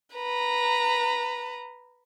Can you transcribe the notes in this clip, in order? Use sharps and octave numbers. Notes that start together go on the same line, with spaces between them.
B4 A#5